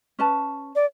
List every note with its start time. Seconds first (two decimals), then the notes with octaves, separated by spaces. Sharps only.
0.19 C#4 B4 A5
0.76 D5